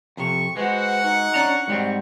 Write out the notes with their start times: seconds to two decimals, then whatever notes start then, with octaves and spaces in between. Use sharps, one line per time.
0.17 F2 C3 C#6
0.57 G#3 F#4 B4 C5 F#5
1.04 D#4 C#6
1.34 C#4 D4 A#5
1.68 G#2 F#3 G3 C4